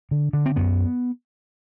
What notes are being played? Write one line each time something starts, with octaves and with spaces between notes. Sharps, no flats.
D3
D3
C4
F#2 B3